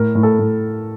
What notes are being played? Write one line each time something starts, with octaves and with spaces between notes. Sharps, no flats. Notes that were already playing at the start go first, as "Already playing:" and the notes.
Already playing: A2 A#4
A2
A4
A2